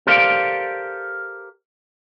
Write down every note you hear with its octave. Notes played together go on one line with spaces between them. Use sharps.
G4 A4 A#4 C5 D5 F5